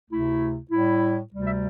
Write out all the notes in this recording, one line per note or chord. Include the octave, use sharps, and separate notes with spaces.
D2 C3 A3 E4
A2 G3 E4
D2 C3 G3
E5